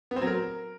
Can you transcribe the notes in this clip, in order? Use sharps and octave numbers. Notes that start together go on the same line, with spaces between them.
B3
C4
F#3
A#4